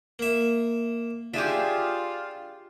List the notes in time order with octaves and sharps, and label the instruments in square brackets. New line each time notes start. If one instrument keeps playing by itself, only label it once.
[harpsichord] A#3 E5
[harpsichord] D4 [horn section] F4 [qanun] G4 G#4 E5